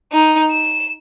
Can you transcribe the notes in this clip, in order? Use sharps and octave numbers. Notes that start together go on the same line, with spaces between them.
D#4
E7